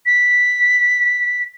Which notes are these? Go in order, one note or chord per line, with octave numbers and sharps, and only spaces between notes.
B6